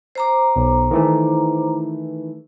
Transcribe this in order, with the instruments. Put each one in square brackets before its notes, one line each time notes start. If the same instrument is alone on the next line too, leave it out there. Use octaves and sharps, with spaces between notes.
[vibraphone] C5 A#5 D6
[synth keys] B1
D#3 E3 A3